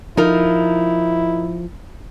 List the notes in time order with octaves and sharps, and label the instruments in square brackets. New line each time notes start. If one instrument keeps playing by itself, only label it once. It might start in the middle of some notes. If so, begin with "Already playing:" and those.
[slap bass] F3 [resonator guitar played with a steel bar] D#4 A#4 [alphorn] E4